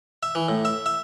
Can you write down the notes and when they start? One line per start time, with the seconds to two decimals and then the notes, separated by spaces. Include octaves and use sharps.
0.23 E5
0.35 E3
0.49 A2
0.65 E5
0.86 E5